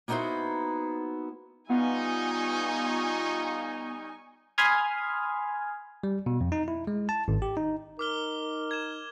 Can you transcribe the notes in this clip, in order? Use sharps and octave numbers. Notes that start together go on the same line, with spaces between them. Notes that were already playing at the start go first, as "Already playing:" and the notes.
A#3 B3 D#4 E4 F#4 C5
G3 B3 D#4 F4 G#5 C#6
G#5 B5 C6 D#6 F6 G#6
G3
B2
F2
D#4
E4
G#3
A5
G#1
G4
D#4
D#4 A#4 D6 F6 G7
G#6 E7